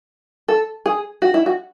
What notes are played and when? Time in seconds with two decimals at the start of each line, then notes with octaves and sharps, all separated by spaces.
0.48 A4
0.86 G#4
1.22 F#4
1.34 E4
1.46 F#4